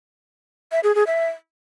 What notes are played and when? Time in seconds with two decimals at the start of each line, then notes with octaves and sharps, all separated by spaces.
0.72 E5
0.84 G#4
0.95 G#4
1.07 E5